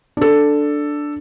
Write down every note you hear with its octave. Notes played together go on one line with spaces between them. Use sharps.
D4 A4